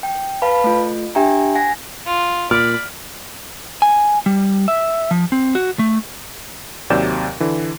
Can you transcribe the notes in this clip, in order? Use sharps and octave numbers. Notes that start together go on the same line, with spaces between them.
G5
B4 F5 A5 B5
A3 F4
D4 G4 E5 G5 G#5 A#5
F#5 G#5 A#6
F4
A#2 D5 B5 F6
G#5
G3
E5
F3
C4
F#4
A3
D#2 C3 F#3 D5 G6 E7
D3 E3